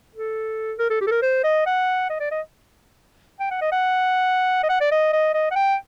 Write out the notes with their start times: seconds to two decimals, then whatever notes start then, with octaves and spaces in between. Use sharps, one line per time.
0.15 A4
0.79 A#4
0.90 A4
1.01 G4
1.07 A4
1.11 A#4
1.22 C5
1.44 D#5
1.66 F#5
2.09 D#5
2.20 D5
2.31 D#5
3.40 G5
3.51 F#5
3.61 D#5
3.72 F#5
4.63 D#5
4.69 F#5
4.81 D5
4.92 D#5
5.13 D#5
5.34 D#5
5.51 F#5
5.56 G5